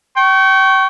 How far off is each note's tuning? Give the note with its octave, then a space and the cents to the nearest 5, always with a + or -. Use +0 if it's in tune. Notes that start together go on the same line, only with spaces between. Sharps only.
G5 -30 C#6 +0